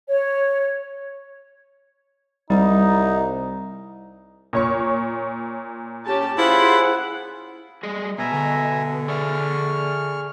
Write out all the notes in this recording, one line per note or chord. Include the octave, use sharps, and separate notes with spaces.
C#5
C2 G3 D#4
A#2 C#5 C#6
C#4 G4 A5
E4 F4 G#4 C5 F#5 B5
G3 G#4 D#5
B2 E5 G#5 A#5
D3
G#4 D5 E5 C#6 F6